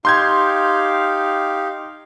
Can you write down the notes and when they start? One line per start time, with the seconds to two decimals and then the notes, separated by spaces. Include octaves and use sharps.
0.05 D#4 G4 F5 C6 G6 G#6